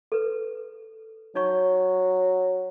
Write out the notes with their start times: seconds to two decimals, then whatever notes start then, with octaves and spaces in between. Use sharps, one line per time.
0.12 A4 B4
1.35 F#3 D#4 C#5 C#6